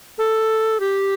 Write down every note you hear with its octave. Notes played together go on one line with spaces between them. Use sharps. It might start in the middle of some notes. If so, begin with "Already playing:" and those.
A4
G4